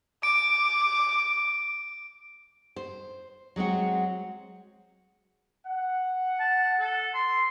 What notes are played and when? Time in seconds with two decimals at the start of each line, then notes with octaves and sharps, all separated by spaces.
0.23 D6 D7
2.76 C5
3.56 F#3 G#3 C4 F#4
5.67 F#5
6.40 A5
6.80 A4
7.14 C6